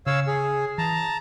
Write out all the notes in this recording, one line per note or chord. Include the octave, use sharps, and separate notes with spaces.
C#3 C#5 F5 E6
G#4
E3 A5 A#5